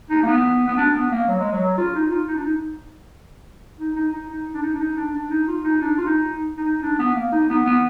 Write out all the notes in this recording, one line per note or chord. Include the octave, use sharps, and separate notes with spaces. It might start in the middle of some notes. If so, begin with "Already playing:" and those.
D#4
A#3
B3
B3
D4
B3
A#3
F#3
G#3
F#3
F4
D#4
F4
D#4
D4
D#4
D#4
D#4
D#4
D#4
D4
D#4
D4
D#4
D4
D4
D#4
F4
D#4
D4
F4
D#4
D#4
D4
B3
A#3
D#4
B3
B3